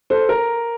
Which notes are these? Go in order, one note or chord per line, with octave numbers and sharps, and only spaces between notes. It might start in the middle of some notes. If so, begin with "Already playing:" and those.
A4 C5
A#4